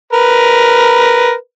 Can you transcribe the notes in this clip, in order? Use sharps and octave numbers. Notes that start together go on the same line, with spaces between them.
A#4 B4